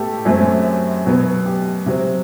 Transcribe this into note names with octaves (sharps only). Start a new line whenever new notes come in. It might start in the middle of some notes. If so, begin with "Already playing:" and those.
Already playing: A2 B3 G4 A4
F#2 F#3 A3 C4
B2 F#3 B3
G4
C3 F#3 C4